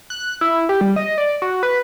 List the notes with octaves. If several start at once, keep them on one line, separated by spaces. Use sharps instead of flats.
F#6
E4
G4
G3
D#5
D5
F#4
B4